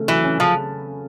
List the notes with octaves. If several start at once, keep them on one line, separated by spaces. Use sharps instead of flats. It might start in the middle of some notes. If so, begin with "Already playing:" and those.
Already playing: C#3 A3 C#4
E3 F#3
C#4
C#3 F3